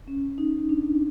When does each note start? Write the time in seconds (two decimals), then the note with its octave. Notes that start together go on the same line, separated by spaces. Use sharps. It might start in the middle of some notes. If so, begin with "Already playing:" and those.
0.08 C#4
0.38 D#4
0.69 D4